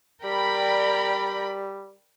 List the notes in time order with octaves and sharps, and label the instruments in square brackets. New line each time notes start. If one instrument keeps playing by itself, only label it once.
[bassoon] G3 [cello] A#4 [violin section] D5 G5 B5